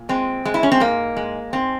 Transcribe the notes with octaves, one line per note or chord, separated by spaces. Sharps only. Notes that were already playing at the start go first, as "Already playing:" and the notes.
Already playing: A#2
G#3 C4
G#3
E4
C#4
C4
G#2 A#3
G#3
G#2 C4